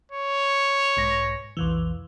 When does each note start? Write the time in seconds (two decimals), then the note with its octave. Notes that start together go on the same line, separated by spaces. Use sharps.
0.12 C#5
0.97 B1 G#2 A#6
1.57 B1 F2 E3